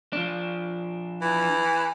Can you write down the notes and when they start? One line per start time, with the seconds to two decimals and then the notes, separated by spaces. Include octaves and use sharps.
0.13 F3 D4
1.21 E3